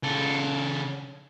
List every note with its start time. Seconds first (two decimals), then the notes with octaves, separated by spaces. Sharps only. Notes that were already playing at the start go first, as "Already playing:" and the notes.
0.03 C#3 A4